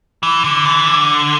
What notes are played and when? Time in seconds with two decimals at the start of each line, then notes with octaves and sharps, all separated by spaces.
0.23 E3
0.44 D3
0.65 E3
0.86 D3